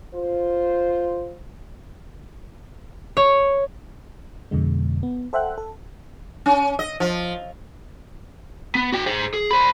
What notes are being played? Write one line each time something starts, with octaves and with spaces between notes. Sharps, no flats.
F4 C5
C#5
F2 B2 D3 G#3
B3
A4 C5 E5 F#5 G5 F#6
A4
C#4
D#5
F3
B3
F#4 G5
G#4 C5
G#4
C5 B5